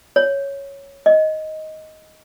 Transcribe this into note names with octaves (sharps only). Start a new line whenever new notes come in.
C#5
D#5